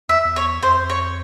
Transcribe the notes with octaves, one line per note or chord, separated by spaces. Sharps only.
E2 E5
E2
C#5
F2 C5
C#5